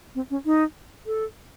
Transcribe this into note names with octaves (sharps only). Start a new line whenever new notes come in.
C4
C#4
D#4
A4